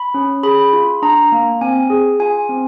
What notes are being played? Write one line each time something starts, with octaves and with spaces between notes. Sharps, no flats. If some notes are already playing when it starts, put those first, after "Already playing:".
Already playing: B5
C#4
G#4 B5
F4
D4 A#5
A#3
C4 G#5
G#4
F4 G#5
C4